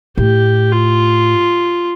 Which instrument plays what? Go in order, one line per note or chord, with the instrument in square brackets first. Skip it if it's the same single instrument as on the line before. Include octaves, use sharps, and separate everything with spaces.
[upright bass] A2 [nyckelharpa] G4
[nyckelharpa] F4